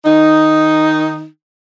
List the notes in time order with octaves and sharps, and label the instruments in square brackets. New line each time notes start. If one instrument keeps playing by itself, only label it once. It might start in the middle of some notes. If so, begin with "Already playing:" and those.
[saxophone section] D#3 D#4